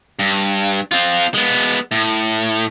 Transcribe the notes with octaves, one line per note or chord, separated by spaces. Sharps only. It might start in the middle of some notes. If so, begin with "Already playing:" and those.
G2
C4 F4
G#3 B3
A2